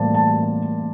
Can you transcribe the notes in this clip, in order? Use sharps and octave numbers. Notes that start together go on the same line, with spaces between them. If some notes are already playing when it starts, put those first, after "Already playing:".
Already playing: A2 E3 G3 A#3 C5 D5 A5
A5